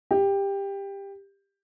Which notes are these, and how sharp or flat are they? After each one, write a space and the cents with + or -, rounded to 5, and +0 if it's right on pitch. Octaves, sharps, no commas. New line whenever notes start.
G4 +15